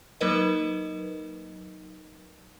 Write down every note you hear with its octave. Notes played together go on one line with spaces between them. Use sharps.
F#3 A#3 D#4 A#4 B4 D#5